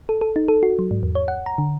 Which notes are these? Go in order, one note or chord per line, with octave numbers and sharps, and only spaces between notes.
A4
A4
D#4
A4
F#4
F#3
G#2
E2
C#5
F#5
A#5
D3